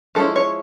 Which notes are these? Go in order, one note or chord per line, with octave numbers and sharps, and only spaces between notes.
F3 G#3 C#4 E4 A4
C#5